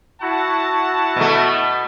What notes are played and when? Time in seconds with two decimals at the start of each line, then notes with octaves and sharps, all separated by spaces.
0.22 E4 F#4 F#5 A5
1.16 B2 A3